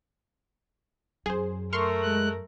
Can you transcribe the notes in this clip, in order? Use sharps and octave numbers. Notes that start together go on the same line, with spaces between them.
F#2 G#4 C5
A3 A#4 C6 C#6 F6
G#3 F#6